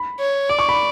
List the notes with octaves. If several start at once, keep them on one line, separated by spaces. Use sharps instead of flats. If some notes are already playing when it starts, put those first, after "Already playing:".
Already playing: B5
C#5
D5 D6
C#6
B5